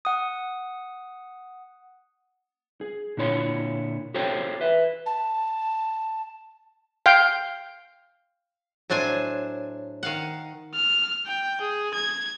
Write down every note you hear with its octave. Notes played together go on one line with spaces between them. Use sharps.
F#5 D#6
G#4
A#2 D3 E4 C#5 C6
F#4 G4 A4 C5 C#5 G5
B4 E5
A5
F5 G5
A2 F#3 D4 C5 G#5
D#3 F5 F#5
F6
G5
G#4
G#6